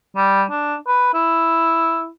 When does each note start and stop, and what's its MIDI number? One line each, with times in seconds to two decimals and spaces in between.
0.16 0.43 55
0.50 0.75 62
0.87 1.12 71
1.14 2.08 64